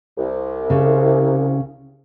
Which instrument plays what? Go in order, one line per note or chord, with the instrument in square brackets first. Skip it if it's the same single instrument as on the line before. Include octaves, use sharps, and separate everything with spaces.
[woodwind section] C2
[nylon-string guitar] C#3